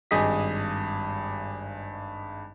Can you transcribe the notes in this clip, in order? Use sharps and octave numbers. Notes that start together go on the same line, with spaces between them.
G#1 G2 G#4 D#5 D#6 B6